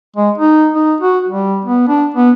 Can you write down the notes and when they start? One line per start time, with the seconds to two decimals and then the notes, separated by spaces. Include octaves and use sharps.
0.16 G#3
0.38 D#4
0.74 D#4
1.00 F#4
1.28 G3
1.65 B3
1.88 D4
2.14 B3